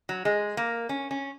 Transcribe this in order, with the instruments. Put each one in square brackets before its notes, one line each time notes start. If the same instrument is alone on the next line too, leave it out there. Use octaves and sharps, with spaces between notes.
[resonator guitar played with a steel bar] F#3
G#3
A#3
C#4
C#4